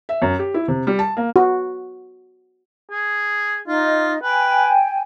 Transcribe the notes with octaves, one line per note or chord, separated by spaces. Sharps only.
E5
F#2
G4
E4
C3
G3
A5
A#3
F#4
G#4
D#4 F4 D#5
B4 G5 G#5